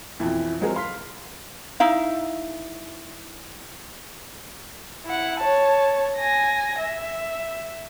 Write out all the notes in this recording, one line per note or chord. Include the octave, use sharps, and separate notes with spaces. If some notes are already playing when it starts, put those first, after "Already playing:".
B1 F2 E3 F3
F3 F#3 G#3 C4 G#4 A#4
F5 C6 F6 B6
D#4 E4 F5
E4 F#5
C#5 A5
G#5 A#6
E5